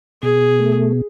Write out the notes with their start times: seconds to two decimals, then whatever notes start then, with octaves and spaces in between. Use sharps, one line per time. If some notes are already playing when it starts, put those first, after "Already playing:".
0.22 B2 G#4
0.60 A3